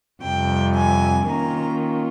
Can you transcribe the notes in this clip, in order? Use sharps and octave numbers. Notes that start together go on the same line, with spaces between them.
F2 C3 G3 G5
G#5
D#3 A#3 C#4 F4 A#5